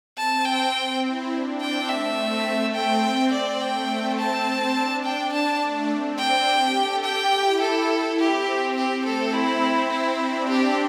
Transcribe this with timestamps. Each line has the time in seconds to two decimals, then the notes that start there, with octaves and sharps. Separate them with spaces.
0.17 C4 A5
0.45 C4 G5
0.75 C4
1.04 E4
1.32 D4
1.61 C4 G5
1.89 A3 E5
2.18 C4
2.47 A3
2.75 C4 G5
3.32 D5
3.60 A3 G5
3.90 C4
4.19 C4 A5
4.75 D4
5.04 D4 G5
5.33 A5
5.61 A3
5.90 C4
6.19 D4 G5
6.47 G4
6.76 A4
7.04 G4 G5
7.33 E4
7.61 A4
8.19 C4 G4
8.76 G4
9.04 A3 A4
9.33 C4 E4
9.62 C4
9.90 C4 E4
10.20 D4
10.49 G4